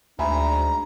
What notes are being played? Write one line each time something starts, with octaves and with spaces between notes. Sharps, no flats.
D2 G#2 D4 E5 G#5 A#5 B5